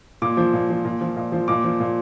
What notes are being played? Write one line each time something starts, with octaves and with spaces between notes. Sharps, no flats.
A#2 D6
F3
A#2
F3
A#2
F3
A#2
F3
A#2 D6
F3
A#2